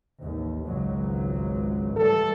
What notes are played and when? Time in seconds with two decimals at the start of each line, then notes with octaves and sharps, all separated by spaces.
0.21 A1 D#2
0.65 G#1 C#2 F#3
1.97 E3 G3 A3 A4